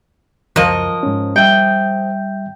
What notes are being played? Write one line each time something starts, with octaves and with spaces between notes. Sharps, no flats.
C#2 F#2 F3 A#4 D#5
G#2 C#4
G3 E5 G5